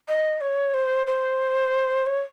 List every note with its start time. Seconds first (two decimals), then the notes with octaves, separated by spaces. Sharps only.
0.08 D#5
0.41 C#5
0.74 C5
1.07 C5
2.06 C#5